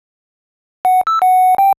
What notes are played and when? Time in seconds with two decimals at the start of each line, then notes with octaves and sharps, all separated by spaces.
0.85 F#5
1.07 E6
1.22 F#5
1.58 G5